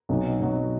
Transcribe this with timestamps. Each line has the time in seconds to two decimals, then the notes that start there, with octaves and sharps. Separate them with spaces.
0.09 B1 B2 F#3
0.39 B1 B2 F#3